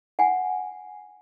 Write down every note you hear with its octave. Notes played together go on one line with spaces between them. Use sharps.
F#5 G#5